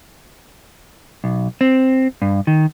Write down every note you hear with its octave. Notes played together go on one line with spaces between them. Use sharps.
B1
C4
G2
D#3